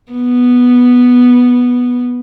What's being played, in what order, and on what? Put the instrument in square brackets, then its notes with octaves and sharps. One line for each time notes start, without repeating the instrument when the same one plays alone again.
[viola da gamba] B3